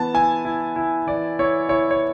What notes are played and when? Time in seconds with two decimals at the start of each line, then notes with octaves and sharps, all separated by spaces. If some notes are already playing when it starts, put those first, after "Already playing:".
Already playing: E3 B3 A5
0.14 E4 G#5
0.45 E4
0.76 E4
1.07 E3 D5
1.39 E4 C#5
1.69 E4 C#5
1.91 C#5